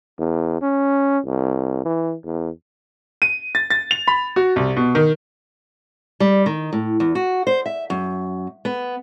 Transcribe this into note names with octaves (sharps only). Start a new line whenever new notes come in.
E2
C#4
C2
E3
E2
D#7
A6
A6
F7
B5
F#4
C2
B2
D#3
G3
D#3
A2
E2
F#4
C5
E5
F#2
B3